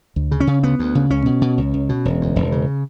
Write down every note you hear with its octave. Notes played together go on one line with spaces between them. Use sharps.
D2
C#3
C#4
C#3
D2 B3
D2
C#3
C#2 C#4
B2
B2
C#2
C#2
B2
E1
D2
E1
C#3